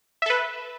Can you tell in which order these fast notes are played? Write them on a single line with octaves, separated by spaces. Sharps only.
E5 A4 B4